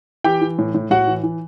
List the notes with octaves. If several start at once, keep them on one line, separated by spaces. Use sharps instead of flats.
E3 G4 G5
E3
A2
A2
A2 F#4 F#5
E3
E3